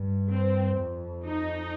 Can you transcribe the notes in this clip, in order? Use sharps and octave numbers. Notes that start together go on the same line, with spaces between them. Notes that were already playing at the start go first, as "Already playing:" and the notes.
Already playing: G2
C4
F2
D#4